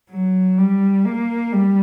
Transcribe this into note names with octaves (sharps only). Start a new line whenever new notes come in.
F#3
G3
A#3
G3